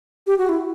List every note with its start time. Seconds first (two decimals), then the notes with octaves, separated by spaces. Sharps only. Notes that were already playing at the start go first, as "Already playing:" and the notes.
0.27 G4
0.38 F#4
0.49 E4